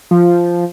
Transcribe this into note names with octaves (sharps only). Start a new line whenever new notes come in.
F3